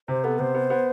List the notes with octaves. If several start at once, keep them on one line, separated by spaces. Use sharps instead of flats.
C3 C5
B3 A4
C3 C5
B3
B3